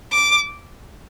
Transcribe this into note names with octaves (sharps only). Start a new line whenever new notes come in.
D6